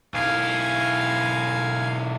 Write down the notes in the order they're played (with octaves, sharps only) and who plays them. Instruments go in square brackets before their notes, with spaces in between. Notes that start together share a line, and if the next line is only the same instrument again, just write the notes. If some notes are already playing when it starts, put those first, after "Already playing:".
[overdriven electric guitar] B1 E4 [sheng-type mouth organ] F5 G#5